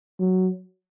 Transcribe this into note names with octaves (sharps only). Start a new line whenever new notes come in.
F#3